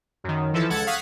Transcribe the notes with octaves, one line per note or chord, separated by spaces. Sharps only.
F#2 D#3
E3 F3 E4 A4
C#2 A4 F#5 G#6 A6
F5 F#5 C#6 D#6 G#6 B6